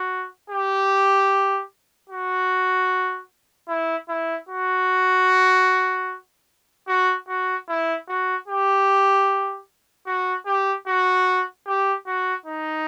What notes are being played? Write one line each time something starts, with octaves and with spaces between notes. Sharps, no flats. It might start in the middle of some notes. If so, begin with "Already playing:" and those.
Already playing: F#4
G4
F#4
E4
E4
F#4
F#4
F#4
E4
F#4
G4
F#4
G4
F#4
G4
F#4
D#4